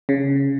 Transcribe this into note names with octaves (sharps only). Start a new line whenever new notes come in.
C#3